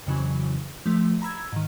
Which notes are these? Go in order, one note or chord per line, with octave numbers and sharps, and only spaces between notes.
F2 C#3 E3 F#3
F3 A3
A#5 B5 E6 G#6
G#2 D#3